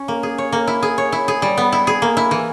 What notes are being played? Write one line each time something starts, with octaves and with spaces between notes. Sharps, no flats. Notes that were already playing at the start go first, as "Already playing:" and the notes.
Already playing: C#4
A#3
G#4
C#5
A#3
E4
G#4
C#5
E4
G#4
G3
B3
E4
G#4
A#3
E4
E3